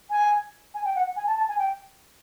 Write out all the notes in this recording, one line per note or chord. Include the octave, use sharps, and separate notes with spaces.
G#5
G#5
G5
F#5
G#5
A5
A5
G#5
G5